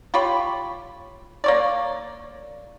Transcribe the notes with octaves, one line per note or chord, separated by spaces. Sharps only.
F4 G4 C#5 B5
A#3 C#5 D5